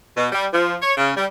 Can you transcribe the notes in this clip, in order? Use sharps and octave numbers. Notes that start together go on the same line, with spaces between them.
B2
G3
F3
C#5
C#3
G3